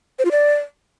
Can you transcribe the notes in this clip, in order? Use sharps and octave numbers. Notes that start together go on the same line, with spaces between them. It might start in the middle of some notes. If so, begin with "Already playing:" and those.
C5
F4
D5